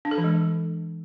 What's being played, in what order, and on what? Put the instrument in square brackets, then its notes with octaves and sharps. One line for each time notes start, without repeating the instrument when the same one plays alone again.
[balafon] D4
A4
E3
G#3